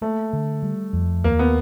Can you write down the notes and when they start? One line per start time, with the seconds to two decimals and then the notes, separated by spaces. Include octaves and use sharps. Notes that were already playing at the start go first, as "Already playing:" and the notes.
0.02 A3 A#3
0.33 D3
0.63 G3
0.93 F2
1.24 D#2 A#3
1.39 B3